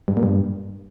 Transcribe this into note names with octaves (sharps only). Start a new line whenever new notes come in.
G2
A#2
G2